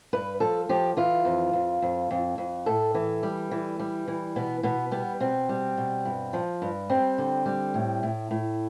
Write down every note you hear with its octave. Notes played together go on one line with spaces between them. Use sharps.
G2 B4
F3 A4
F3 G4
E3 F4
F2
F2
F2
F2
F2
A2 A4
E3
G3
E3
G3
E3
B2 B3
B2 B3
G3 B3
B2 C4
G3
B2
G2
F3
G2
G3 C4
D3
G3
A2
A2
A2